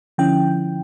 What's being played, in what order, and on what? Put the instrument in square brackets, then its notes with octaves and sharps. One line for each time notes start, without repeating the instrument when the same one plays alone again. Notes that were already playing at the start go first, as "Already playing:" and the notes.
[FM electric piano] D3 F3 C#4 E4 G5